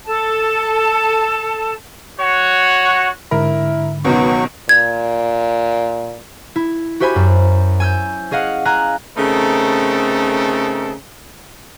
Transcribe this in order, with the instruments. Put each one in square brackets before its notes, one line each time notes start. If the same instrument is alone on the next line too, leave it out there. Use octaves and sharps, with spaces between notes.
[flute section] A4 A5
[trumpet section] F#4 C#5 F#5
[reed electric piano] G#2 D3 B5 [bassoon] E4 [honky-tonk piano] A#4
[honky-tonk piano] C#2 B2 D#3 [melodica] F#3 C#6 [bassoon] B3
[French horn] A#2 [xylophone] G#6
[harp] E4
F#4 G4 C5 E5 G#5 B5
F#2
G#5 E6 G6
C#4 G#4 D#5 F5 F#5
F5 G#5 A#5 F#6
[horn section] C#3 A3 C4 D#4 A4 A#4